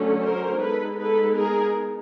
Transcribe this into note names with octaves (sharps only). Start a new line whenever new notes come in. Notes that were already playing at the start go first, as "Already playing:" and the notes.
Already playing: D3 F#3 A3 C#4
A#4 C5
G#3 B3 D#4 A4 B4
A4 B4
G#4 A#4